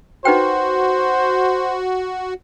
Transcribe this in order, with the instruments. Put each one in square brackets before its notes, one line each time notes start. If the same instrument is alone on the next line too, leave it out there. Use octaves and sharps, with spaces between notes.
[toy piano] D#4 B4 G5 [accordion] F#4 [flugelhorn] C5